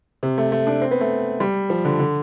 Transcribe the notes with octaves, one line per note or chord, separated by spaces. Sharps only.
C3
A3
A3
D4
C4
B3
A3
G3
F3
D3
D3